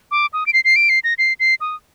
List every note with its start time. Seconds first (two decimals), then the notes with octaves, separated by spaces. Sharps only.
0.11 D6
0.33 D#6
0.47 D7
0.53 C7
0.64 C7
0.76 D7
0.89 C7
1.04 A#6
1.18 C7
1.40 C7
1.61 D#6